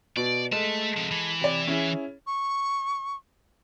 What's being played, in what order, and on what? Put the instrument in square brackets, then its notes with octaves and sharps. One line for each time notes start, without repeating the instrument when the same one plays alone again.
[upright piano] B2 [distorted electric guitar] D5
[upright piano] G#3 A4 [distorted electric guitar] A3 A5
[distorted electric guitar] C3 F3
E3
[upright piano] C3 D5
C#4 E4 G#4
[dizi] C#6